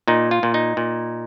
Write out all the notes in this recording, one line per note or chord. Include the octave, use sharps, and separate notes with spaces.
A#2 D#4
F4
A#2
D#4
A#2